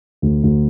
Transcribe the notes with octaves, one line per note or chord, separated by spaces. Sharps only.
D2
D2